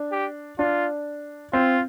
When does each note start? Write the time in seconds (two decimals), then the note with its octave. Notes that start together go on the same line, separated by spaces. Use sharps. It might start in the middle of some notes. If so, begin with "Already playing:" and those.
Already playing: D4
0.12 G4
0.59 D4 F4
1.53 C4 F4